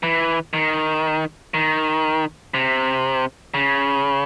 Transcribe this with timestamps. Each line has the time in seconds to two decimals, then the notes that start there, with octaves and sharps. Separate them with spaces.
0.03 E3
0.54 D#3
1.54 D#3
2.54 C3
3.54 C#3